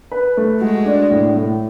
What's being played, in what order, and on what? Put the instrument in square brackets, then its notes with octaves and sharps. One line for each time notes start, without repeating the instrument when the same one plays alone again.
[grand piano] B4
A3
[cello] G#3 [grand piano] F#4
[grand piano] D4
A2
A2